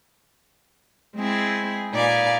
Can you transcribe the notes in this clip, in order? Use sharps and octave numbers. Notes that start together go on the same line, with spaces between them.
G#3 C4 E4 G#4
A#2 D#4 B4 D5 F5 G#5